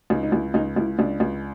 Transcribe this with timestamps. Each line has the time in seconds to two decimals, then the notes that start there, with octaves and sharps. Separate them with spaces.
0.10 C#2 D#4
0.23 D#4
0.32 C#2 E4
0.54 C#2 D#4
0.76 C#2 E4
0.99 C#2 D4
1.20 C#2